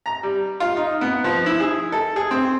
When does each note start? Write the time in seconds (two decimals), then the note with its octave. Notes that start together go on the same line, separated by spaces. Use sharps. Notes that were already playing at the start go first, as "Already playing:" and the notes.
0.06 A#5
0.23 G3
0.60 F4
0.77 D#4
1.01 B3
1.24 F3
1.46 E4
1.60 G#4
1.92 A4
2.16 G#4
2.31 C4